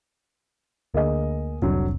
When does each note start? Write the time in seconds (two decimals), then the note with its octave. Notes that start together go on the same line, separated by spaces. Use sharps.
0.94 D2 D3 A#3 G#4 D#5
1.62 F1 C2 D3 F#3 C4